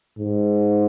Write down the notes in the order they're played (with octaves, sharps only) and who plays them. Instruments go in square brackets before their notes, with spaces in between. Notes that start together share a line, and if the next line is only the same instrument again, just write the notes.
[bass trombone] G#2